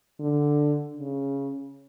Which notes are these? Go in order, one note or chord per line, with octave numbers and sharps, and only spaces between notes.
D3
C#3